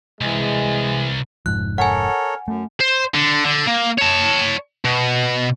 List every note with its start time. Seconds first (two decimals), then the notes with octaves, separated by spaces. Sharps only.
0.21 C2 E3 G#3
1.46 F1 G#2 F3 F#6
1.78 A4 A#4 C#5 F#5 G#5
2.48 F#2 A3
2.80 C5
3.14 D3
3.45 D3
3.67 A#3
3.99 C#5 A5
4.85 B2